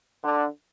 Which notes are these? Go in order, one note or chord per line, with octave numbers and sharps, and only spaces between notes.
D3